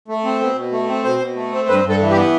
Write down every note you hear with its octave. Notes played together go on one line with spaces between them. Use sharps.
A3
C4
B2
B2
A3
C4
B2 C5
B2
A3
C4
G2 B4
G2
A4
E3
G4
B3